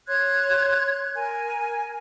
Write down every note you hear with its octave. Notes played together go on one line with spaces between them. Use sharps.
C#5 C6 F#6 G#6
A#4 G#5